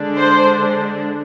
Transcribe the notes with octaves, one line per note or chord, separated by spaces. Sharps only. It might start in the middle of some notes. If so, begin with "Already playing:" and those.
Already playing: D3 G#3 D4
C5